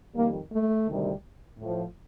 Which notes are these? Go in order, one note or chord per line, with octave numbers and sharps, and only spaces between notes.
F2 D#3 G3 A#3
A3
D2 C3 D#3 G3
A2 F3